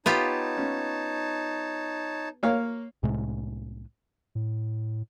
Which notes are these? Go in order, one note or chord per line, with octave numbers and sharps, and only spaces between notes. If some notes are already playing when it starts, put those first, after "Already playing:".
B3 D#4 F4 G4 C#5 A5
C#4
A#3 C#5 F5
C2 A2 C3 G#3
A2